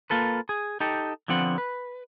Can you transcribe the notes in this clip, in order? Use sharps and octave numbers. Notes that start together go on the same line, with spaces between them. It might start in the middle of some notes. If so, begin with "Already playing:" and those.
A#3 F4 A4 B4
G#4
D#4 G4 A4
D3 F3 B3 C4 F#5
B4